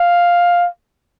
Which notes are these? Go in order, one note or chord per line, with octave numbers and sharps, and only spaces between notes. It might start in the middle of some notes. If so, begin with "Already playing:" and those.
Already playing: F5